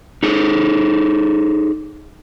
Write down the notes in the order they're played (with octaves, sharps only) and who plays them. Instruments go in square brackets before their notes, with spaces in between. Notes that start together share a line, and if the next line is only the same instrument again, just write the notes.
[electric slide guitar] D#4 G#4 A4